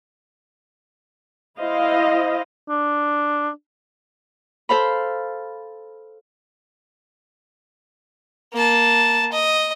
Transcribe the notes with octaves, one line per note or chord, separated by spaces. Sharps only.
E4 C5 D#5 F5
D4
A4 C5 F5 B5
A#3 A5
D#5